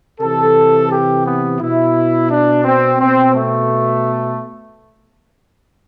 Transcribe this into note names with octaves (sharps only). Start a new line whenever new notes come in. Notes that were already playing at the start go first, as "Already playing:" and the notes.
C3 E3 A4
G4
B3
B2 E4
D4
C4
B2 C4
A3